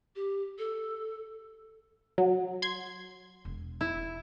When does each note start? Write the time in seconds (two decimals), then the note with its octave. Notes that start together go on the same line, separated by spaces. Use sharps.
0.16 G4
0.59 A4
2.18 F#3
2.62 C6 G#6
3.45 E1
3.81 E4